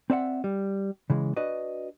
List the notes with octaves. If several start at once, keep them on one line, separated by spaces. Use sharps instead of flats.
C4 D5 E5 F#5
G3
C#3 E3 G#3
D4 F#4 B4 D5 D#5